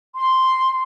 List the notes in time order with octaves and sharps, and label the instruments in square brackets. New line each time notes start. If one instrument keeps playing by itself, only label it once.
[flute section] C6